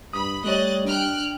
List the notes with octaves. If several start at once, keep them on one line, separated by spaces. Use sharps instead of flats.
G2 B5 D#6
G3 A3 C#5 D#5 F#6 A6
D4 G5 F6 F#6